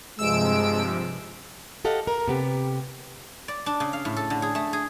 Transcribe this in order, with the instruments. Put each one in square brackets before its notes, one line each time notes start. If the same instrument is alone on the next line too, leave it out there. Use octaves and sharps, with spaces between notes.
[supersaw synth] G2 C3 F3 [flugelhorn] G#3 [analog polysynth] E6 D7
[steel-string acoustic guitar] G4 A4 D#5 F5 F#5
A#4
C3 B3 G4
[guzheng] D5
D4
C#3
F5
A2
A4
D3
G#4
A3
G#4